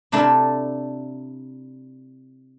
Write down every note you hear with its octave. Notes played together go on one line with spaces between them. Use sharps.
C3 A3 D4 E4 A#4